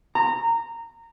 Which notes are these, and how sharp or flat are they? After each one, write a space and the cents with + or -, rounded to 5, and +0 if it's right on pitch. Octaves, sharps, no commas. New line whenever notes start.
A#5 -20